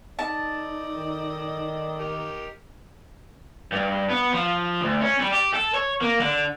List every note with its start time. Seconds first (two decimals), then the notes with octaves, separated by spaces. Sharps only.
0.19 D#4 A4 D5 D#5 A5
0.96 D#3
1.99 D#4 G4 A#4
3.72 G2
4.10 B3
4.33 F3
4.81 D2
5.01 C#4
5.20 G3
5.33 G4
5.54 A4
5.75 C#5
6.02 A#3
6.21 D3